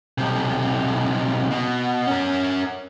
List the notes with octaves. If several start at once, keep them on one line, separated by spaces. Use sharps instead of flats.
B1 C3
B2
C#4 A#4